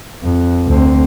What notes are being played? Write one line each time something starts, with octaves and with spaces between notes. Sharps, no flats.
F2
D2 C4